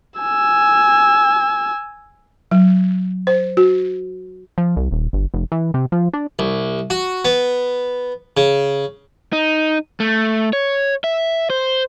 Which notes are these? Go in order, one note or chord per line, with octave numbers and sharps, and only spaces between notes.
G#5 E6
F#3
C5
F#4
F3
C2
D#1
G1
F1
E3
C3
F3
D4
C2
F#4
B3
C#3
D#4
A3
C#5
E5
C5